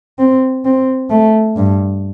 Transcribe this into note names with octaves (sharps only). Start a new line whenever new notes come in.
C4
C4
A3
G2